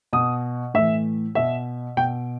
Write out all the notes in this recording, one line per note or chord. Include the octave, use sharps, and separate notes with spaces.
B2 D#6
A2 E3 E5
B2 E5
B2 G5